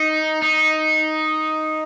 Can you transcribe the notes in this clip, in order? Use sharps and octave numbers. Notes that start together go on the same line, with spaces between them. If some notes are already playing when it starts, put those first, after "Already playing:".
Already playing: D#4
D#4